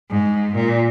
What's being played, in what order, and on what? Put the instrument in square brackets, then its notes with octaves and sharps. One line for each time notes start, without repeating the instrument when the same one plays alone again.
[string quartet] G#2
A#2